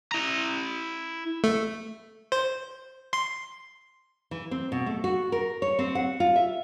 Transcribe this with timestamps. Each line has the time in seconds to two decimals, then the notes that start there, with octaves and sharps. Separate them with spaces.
0.12 E4 A#5
1.44 A3
2.32 C5
3.13 C6
4.31 E3
4.51 C4
4.72 B2
4.86 A3
5.04 F#4
5.32 A#4
5.62 C#5
5.79 C4
5.95 F#5
6.20 F4
6.36 E5